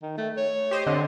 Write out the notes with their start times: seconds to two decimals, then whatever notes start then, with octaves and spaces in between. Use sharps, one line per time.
0.02 D#3
0.18 A3
0.37 C#5
0.71 G4 C5 D#5
0.86 D3 C4 D#5